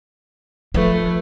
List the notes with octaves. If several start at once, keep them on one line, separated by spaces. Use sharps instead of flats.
F3 A3 B4